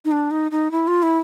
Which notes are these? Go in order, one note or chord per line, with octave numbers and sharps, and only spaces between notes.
D#4
D4
D#4
D#4
E4
F4
E4